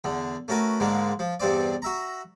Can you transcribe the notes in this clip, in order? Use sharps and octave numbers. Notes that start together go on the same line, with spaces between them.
E2 D3
A3 C#4 F#4 A#4 B4
G#2 D3 D#3 G#3 A#3
F3
E2 G2 C4 D5
F#4 E5 A#5